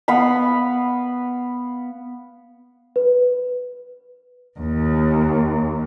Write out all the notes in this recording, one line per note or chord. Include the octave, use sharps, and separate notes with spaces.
B3 F5 B5
B4
D#2